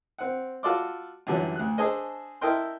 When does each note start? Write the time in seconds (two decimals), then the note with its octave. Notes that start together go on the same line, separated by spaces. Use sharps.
0.18 C4 F#5
0.63 F4 F#4 A4 D5 C6 D6
1.27 F#2 A#2 D3 E3 G3 C#4
1.56 D2 F#6
1.78 D4 G#4 A4 C5 D#5 G#5
2.41 E4 A4 A#4 D#5 G5 C6